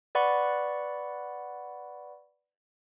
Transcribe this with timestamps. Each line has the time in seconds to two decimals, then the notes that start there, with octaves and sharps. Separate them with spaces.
0.15 B4 D5 F#5 B5 C#6